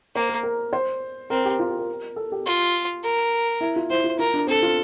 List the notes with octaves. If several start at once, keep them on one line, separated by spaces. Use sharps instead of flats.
A#3 C5
A#4
A#4
C5
C4 A#4
G4
F4
G4
A#4
A4
G4
F4
A#4
E4
F4
E4 C5
F4
F4 A#4
D4
C4 A4
F4